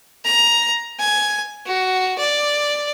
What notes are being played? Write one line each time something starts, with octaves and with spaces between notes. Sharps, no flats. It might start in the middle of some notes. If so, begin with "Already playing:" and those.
A#5
G#5
F#4
D5